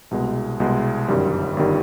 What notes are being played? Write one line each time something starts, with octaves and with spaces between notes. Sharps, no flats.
C2 B2 G#3
C2 B2 G#3
G1 F#2 D#3 G3
G1 D#3 G3